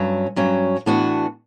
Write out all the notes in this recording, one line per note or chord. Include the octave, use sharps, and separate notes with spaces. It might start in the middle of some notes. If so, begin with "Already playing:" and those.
Already playing: G2 F#3 C#4
G2 F#3 C#4
A2 E3 B3 D4 F#4